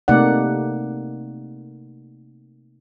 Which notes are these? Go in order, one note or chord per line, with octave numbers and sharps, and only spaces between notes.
C3 A3 A#3 D#4 D5 F#5